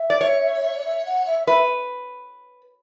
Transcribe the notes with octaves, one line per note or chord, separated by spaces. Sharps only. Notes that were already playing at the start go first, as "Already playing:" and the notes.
Already playing: E5
D5
C#5
D5
E5
F#5
E5
B4 E5